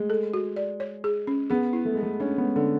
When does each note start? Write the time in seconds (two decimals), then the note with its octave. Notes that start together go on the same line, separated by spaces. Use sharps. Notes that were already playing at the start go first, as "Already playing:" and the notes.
Already playing: G#3 A3
0.10 A4
0.34 F#4
0.56 D5
0.80 C#5
1.04 G#4
1.27 C#4
1.50 B3 G#4
1.73 E4
1.85 A3
1.94 G#3 B3
2.03 A3
2.20 C#4 D4
2.38 B3
2.44 G#3
2.56 D3